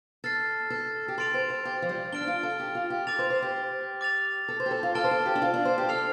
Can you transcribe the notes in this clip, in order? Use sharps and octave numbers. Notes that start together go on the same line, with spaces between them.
A4 F6 A6 C7
A4
G4
A4 C6 A6 D7 F7
C5
A4
G4
F3
G3
D4 F6 D7 G7
F4
A4
G4
F4
G4
A4 D6 A6 F7
C5
C5
G4
D6 A6 F7
A4
C5
G4
A4
F4
A4 A5 F6 D7 G7
C5
A4
G4
D4
F4
D4
C5
G4
A4 F6 C7 F7